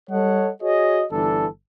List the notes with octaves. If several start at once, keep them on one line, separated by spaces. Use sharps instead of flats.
G3 A4 C#5 D#5 F#5
F#4 G#4 C#5 D#5
G1 E3 D4 A4